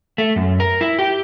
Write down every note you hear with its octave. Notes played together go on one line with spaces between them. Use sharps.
A3
F#2
A#4
E4
G4